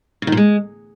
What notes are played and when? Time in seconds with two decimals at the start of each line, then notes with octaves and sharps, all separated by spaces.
0.22 C#3
0.27 D#3
0.32 A#2
0.37 G#3